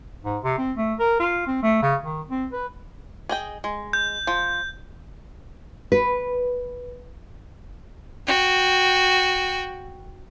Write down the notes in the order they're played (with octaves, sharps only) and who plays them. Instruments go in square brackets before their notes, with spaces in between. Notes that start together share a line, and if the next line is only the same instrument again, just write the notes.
[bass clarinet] G#2
C3
C4
A3
A#4
F4
C4
A3
C#3
D#3
C4
B4
[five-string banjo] G#4 D#5 G5
G#3
[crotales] G6
[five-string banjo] F3
[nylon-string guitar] B4
[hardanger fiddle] F#4 G5